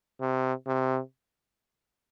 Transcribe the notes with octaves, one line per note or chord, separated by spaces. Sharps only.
C3
C3